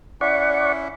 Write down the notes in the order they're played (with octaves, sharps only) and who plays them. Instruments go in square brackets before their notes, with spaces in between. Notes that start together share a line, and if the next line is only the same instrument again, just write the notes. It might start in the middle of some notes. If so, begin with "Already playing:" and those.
[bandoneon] C#4 E4 E5 [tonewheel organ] D5 F#5 C#6